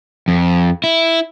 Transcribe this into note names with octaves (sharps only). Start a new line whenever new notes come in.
F2
E4